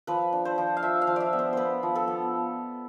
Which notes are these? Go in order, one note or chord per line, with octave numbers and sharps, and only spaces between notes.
F3 B4
D4
C5
F3
F5
F3 E5
F5
F3
D5 E5
B3
C5
B3 B4 C5
F3
A4
B3